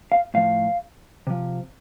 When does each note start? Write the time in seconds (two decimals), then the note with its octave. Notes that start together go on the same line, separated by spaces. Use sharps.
0.12 F5
0.34 A2 F3 F5
1.27 C3 F3